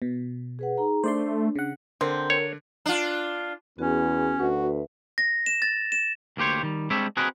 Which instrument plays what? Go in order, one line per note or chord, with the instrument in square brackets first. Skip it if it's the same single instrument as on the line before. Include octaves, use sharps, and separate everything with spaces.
[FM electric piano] B2
[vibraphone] G#4 B4 F#5
D#4 G#4 A#5
[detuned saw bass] A3 [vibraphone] D4 [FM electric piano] C5 D5 C6
[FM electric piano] C#3 F#5
[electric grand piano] D3 [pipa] C4 [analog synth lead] A#4
[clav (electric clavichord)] C#5
[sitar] D4 F4
[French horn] E2 [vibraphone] B3 F#4 G#4 [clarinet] C#4
[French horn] D2 [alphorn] F#4 [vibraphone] B4 E5
[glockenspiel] A#6
E7
A6
E7
[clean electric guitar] D2 A#3 G4 C5 C#5
D#3 G3
G3 G#3 C4 D4 C#5 E5
C4 F#4 G#4 A#4 B4 D#5